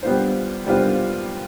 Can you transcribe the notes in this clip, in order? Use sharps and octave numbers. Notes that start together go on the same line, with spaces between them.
G3 B3 D4 F4 C5
G3 B3 D4 F4 C5